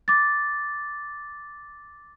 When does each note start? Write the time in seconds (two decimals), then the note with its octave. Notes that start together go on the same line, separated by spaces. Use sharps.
0.08 D6 A6